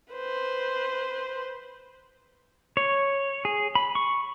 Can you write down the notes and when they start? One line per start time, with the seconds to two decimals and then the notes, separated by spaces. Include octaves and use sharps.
0.13 B4 C5
2.77 C#5
3.45 G#4
3.75 B5
3.95 C#6